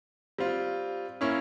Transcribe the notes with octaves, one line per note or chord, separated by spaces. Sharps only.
G3 C4 F4
A#3 C#4 E4